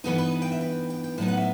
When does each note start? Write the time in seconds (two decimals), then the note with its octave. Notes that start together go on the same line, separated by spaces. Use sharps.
0.04 G2 E3 B3 D#4 A4
0.18 B4
0.42 G5
0.52 E5
0.61 G5
0.90 G5
1.04 G5
1.18 A2 F#3 B3 D#4 A5
1.28 F#5
1.37 E5